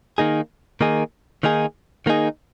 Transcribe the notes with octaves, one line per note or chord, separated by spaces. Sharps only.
D#3 A#3 D#4 G#4
D#3 A#3 D#4 G#4
D#3 A#3 D#4 G#4
D#3 A#3 D#4 G#4